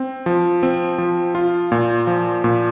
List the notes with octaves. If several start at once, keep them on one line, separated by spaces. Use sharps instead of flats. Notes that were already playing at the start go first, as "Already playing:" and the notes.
Already playing: C4
F3
C4
F3
F4
A#2
F3
A#2